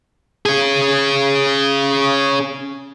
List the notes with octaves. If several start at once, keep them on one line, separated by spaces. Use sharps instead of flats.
C#4 G#4